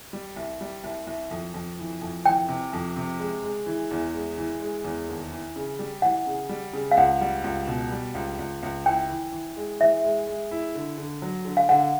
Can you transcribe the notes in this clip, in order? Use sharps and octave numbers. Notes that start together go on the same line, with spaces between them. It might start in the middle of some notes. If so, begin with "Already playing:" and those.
G3
C2
G3
C2
C2
F2
F2
E3
F2
E3 G5
C3
F2
C3
G#3
G#3
E3
E2
G#3
E3
G#3
E2
D#2
E3
C#3
G3
E3 F#5
C#3
G3
C#3
F5
C#2 F#5
G3
C#2
B2
G3
C#2
C#2
C#2
E4 G5
E3
E3
G#3
E3 E5
G#3
G#3
E4
D3
D3
F#3
D3
F5
D3 F#5